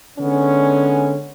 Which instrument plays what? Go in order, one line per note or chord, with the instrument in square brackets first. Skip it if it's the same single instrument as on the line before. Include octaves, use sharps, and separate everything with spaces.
[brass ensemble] D3 G#3 B3 C#4